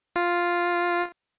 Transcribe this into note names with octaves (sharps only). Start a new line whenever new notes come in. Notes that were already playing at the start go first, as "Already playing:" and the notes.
F4